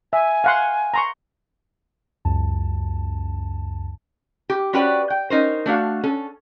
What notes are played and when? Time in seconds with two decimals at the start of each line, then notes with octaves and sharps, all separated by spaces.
0.13 E5 G#5
0.44 F5 F#5 C6
0.94 A#5 C6 C#6
2.25 C#2 F#2 A5
4.49 G4
4.73 C#4 F#4 G4 B4 C5 D5
5.10 G5
5.30 C#4 D#4 A#4 C5
5.66 A3 D4 F#4 F5
6.04 C#4 A4